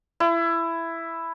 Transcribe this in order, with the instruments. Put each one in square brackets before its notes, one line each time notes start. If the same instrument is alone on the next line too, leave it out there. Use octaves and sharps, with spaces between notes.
[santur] E4